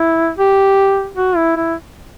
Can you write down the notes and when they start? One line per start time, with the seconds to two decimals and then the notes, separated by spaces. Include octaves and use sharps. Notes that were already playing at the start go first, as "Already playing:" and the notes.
Already playing: E4
0.38 G4
1.17 F#4
1.36 E4
1.56 E4